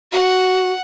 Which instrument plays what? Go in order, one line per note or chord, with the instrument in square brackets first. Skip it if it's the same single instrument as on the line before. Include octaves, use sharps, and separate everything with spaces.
[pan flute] F#4 [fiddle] F#5